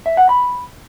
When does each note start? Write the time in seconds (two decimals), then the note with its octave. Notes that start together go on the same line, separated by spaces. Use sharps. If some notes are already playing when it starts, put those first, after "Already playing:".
0.06 E5
0.17 F#5
0.29 B5